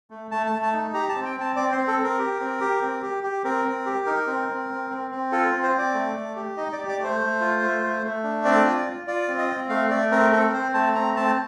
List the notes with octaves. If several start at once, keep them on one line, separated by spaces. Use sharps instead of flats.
A3
A3 A5
A5
A3
A5
D#4
G4 A#5
A5
C4
G5
C4 A5
C4 D5
C5
C4
A4
C4
A#4
G4
C4
G4
C4
G4
G4
C4 A#4
C4
G4
D#4 A#4
C4
C4
C4
C4
C4
F4 A4
C4
C5
C4 D5
A3
A3
G4
D#4 D#5
D5
G4
D5
A3
C5
A3
F4
A3
A3
A3
D4
C4 D5
F4
F4
F4 D5
C4
D#5
C4
A3 F5
A3 D5
C4 A#4
C4 A4
A#4
C4 C5
A3 A5
C4 A#5
C4 A5